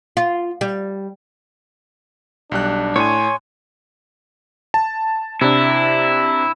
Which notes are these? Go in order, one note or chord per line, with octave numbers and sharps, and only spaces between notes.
F4
G3
B1 G3 D4 F#6
A2 C#5 G#5 C6
A5
C3 D4 E4